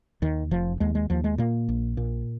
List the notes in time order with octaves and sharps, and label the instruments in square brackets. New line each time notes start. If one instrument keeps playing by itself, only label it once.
[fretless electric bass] D#2 D#3
F1 F3
D#2 G#3
G#3
D#2 F3
G#3
A#2 A#3
A#1
A#2